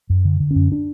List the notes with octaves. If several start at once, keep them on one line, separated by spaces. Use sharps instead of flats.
F#2
D3
D3
F#2 C#4
D4